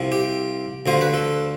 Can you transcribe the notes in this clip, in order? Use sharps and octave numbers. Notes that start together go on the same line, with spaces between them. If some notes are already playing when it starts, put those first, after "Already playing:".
Already playing: C2 C3 F3
G4
D2 D3 F3 C5
B4
A4